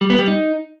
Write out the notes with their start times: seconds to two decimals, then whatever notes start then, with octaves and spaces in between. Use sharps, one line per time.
0.01 G3
0.10 B3
0.19 G3
0.28 D#4